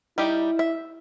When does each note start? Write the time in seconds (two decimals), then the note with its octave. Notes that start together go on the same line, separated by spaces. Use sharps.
0.18 G3 D#4 E4 G4
0.59 E5